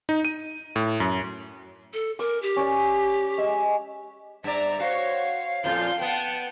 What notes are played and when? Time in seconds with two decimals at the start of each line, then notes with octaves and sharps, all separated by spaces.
0.09 D#4
0.25 D#7
0.76 A2
1.00 F#2
1.94 A4
2.19 A#4 D6
2.42 G4
2.56 C#4 D5
3.38 G#3 E5
4.44 G2 D5 E5 A#5
4.80 F#4 C5 C#5 F5
5.64 F2 A#2 F3 F4 A4 G6
6.01 B3 F#5 G5 A5